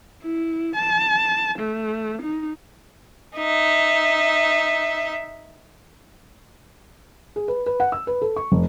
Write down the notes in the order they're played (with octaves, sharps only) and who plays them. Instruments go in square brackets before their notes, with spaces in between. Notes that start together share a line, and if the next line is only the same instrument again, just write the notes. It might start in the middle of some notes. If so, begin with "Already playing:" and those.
[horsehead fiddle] E4
A5
A3
D#4
[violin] D#4 E5
[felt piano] G#4
B4
B4
F#5
E6
B4
A4
C#6
F1